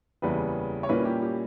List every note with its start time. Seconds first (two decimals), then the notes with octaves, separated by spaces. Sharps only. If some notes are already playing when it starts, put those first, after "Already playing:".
0.22 F#1 E2 C#3 G3 B4
0.83 C#5
0.89 A#2 G3 A#3 C#4 E4 B4
1.05 G4
1.22 G4